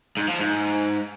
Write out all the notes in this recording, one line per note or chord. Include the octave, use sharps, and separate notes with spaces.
G#2
F3
G#2